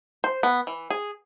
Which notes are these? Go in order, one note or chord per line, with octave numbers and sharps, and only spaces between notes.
C5
B3
E3
G#4